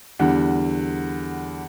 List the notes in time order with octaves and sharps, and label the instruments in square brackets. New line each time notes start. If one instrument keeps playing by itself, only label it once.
[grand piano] E2 D3 G3 F#5